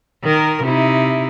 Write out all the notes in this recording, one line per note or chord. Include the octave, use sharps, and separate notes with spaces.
D#3 A#4
C3 D#4 E4